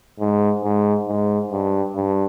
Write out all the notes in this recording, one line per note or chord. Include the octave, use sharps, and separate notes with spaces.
G#2
G#2
G#2
G2
G2